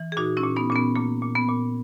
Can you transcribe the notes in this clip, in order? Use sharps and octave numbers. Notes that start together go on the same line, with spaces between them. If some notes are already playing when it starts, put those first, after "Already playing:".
Already playing: E3
G#4
A#2 D#4 F#4
C#4 E4
A#2
B3 D#4
A#2 C#4
B3
A#2 A#3
A#2
B3
A#2